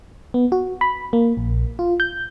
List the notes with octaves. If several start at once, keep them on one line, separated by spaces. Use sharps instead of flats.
B3
F#4
B5
A#3
A#1
F4
G6